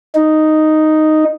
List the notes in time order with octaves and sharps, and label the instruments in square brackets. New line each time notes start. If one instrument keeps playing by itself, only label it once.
[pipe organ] D#4